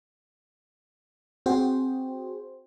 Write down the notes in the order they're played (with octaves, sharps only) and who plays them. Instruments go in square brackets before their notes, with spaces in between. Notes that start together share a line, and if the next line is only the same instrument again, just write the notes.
[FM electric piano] C4 F#4 G#4 C5 G5